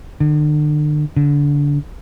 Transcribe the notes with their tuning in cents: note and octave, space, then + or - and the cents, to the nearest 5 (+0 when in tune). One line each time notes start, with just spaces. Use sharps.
D3 +40
D3 -25